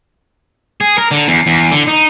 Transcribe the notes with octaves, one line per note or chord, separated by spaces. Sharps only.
G#4
A#4
D3
E2
E2
D3
D#4